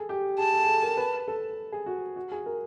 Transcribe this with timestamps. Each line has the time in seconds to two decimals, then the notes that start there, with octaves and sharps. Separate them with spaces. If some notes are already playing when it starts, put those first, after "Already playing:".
Already playing: G#4 A4
0.09 G4
0.38 G#4 A5
0.53 A4
0.63 G#4
0.68 A4
0.83 A#4
0.97 B4
1.28 A4
1.72 G#4
1.86 F#4
2.16 F#4
2.32 G#4
2.46 A#4